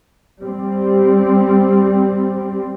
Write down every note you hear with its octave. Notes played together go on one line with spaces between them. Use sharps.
G3 C4